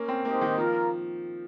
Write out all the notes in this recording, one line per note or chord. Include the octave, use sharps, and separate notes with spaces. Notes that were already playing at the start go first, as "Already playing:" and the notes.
Already playing: A#3 C#4
C4
G#3 A#3 D#4 G4 C5 D#5
D#3
F3 A#3 F4 A#4